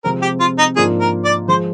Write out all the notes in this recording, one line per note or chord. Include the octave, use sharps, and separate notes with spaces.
C3 F3 G#3 C4 A#4
G4
F4
D#4
G#2 F3 A#3 D4 F4 G#4
A#4
D5
F3 G#3 C5